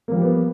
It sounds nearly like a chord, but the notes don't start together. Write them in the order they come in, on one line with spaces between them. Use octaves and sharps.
A#3 F3 G3 F4 B3